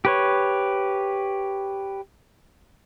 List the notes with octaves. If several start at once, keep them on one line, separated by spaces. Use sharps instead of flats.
G4 B4 C#5